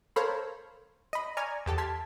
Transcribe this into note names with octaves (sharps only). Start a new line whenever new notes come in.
A4 A#4 C5 C#5 F5 B5
D#5 B5
D5 G#5 A#5 C#6 F6 G#6
E2 G4 A4 A5
A5 C6 F6 G#6 B6